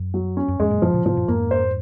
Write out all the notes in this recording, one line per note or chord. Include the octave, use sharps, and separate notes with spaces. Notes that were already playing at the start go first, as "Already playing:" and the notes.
Already playing: F#2
F#3
C#4
F#2
F2 G#2 G#3
F#2 A#2
F#2 A#2 F3
A#2 C#3
G#2 C3 F3
F#2 A#2
F2 G#2 A#3
C5